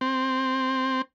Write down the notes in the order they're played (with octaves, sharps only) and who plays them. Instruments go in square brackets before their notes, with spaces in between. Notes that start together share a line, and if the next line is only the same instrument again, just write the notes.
[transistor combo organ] C4